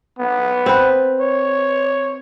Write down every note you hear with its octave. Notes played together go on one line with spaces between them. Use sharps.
B3
C4 B4
C#5